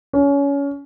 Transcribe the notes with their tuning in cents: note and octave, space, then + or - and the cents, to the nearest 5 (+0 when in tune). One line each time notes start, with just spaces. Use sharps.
C#4 +25